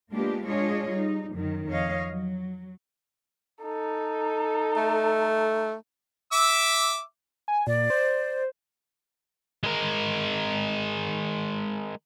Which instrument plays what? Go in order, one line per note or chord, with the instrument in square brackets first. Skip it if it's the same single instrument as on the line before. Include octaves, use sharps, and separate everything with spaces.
[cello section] G#3 A#3 B3 D4 F4 G4
G#3 D4 F4 G#4 C#5 D#5
G3 D#4
F#2 D#3
F2 C#5 D#5 F5
F#3
[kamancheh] D#4 A4
[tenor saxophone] A3
[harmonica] E5 D6 E6
[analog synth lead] G#5
[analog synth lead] A#2 [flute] D5
[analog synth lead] C5
[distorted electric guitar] G#3 A#4